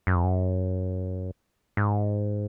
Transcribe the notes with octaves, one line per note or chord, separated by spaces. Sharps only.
F#2
F2
F#2
G#2